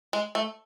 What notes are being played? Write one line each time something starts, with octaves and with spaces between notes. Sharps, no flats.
G#3
A3